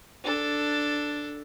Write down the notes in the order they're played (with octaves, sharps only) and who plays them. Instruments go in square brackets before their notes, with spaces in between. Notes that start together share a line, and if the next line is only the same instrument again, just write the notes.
[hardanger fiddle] D4 A4